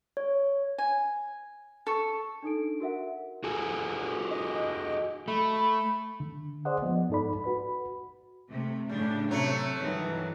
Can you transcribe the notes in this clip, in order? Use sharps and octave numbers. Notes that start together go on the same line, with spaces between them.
C#5
G#5
A4 C#6
D4 D#4 A4 D7
F#4 A#4 E5 F#5
F#4 G#4 A4
D#5
A3 B5
D3
G#4 C5 D5 D#5 F#5
F3 B3
G#2 D#4 A4 D5 B5
F#4 B4 B5
C3 A3
A2 C#3 G3 D4
C3 F#3 A3 C#5
G2 D#3 E3